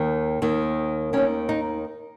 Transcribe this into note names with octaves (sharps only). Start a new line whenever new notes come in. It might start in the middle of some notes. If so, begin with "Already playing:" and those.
Already playing: D#2 D#3
D#2 D#3
D#2 D#3 C#4
D#4